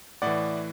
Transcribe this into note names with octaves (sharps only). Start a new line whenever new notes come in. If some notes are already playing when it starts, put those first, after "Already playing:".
A2 E3 D5 F#5